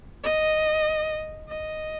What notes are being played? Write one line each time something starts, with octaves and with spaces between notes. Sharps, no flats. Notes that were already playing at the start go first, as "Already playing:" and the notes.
D#5
D#5